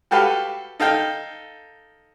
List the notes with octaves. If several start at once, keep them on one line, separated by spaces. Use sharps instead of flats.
F#4 G4 A4 B4 F5
D#4 A4 F5 G5